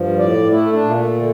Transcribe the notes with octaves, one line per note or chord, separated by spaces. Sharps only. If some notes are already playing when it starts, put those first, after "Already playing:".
Already playing: G2 F3
A2 D5
A3 E4
D4
A#2
A#3
A3
D3